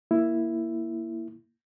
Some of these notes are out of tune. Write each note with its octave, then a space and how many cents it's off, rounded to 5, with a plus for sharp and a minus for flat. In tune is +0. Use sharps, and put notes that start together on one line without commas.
A#3 +0 E4 +5